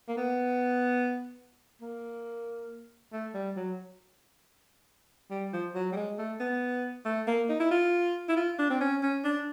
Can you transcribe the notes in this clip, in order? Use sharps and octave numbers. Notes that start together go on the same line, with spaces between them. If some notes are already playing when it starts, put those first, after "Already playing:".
A#3
B3
A#3
A3
G3
F#3
G3
F3
F#3
G3
G#3
A3
B3
A3
A#3
D#4
E4
F4
E4
F4
D4
C4
C#4
C#4
D4